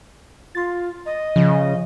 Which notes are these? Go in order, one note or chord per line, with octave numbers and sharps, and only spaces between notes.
F4 C6 A6
D#5
C#3 F3